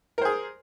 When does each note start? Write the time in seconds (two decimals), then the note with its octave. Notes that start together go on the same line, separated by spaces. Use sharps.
0.18 A#4
0.22 C5
0.25 G#4